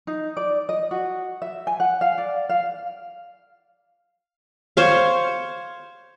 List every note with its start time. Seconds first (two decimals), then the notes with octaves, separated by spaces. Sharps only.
0.07 D#4
0.37 D5
0.69 D#5
0.91 F#4
1.42 E5
1.67 G#5
1.80 F#5
2.01 F5
2.18 D5
2.49 F5
4.77 C5 C#5 F5